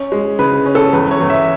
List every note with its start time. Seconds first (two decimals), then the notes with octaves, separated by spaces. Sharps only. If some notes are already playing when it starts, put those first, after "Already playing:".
Already playing: C#4
0.12 G#3
0.39 C#3 B4
0.66 C#4
0.75 A4
0.93 E2 B4
1.11 C#5
1.21 E2
1.30 E5